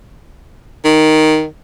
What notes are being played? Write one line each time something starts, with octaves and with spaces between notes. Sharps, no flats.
D#3